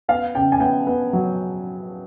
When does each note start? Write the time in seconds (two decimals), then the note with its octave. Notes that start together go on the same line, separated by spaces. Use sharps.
0.08 B3 F5
0.35 C#3 G5
0.52 G#5
0.60 B3 G5
0.87 B3
1.13 F#3